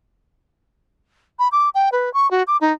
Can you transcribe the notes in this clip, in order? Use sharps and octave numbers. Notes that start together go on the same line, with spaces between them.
B5
D6
G5
B4
C#6
F#4
D6
D#4